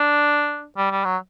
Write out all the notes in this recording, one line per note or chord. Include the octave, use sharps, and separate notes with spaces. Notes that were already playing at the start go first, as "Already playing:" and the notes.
Already playing: D4
G3
G3
F#3